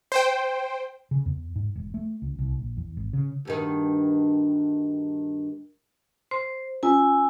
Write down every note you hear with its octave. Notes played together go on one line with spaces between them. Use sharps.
C5 G5
C#3
E2
G#2
E1
A3
C#2
C2
A#1
E2
G#1
C#3
D2 G2 D#3
C5 C6
C#4 F4 G#5 E6